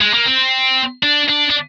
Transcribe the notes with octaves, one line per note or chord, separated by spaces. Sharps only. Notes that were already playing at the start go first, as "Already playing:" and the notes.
G#3
A#3
C4
D4
D4
D4